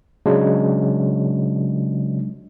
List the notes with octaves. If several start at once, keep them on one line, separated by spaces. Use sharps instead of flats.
C#3 F#3 G#3 D4